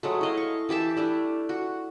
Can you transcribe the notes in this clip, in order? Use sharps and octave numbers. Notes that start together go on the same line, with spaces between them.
F#3 G#3 A3
E4 D#5 F5
C#6
E3 G4 E5 A5
G3 A3 D4 E4
F#4